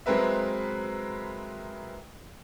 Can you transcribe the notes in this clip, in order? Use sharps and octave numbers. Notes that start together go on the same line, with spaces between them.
F#3 G#3 C4 A#4 B4 E5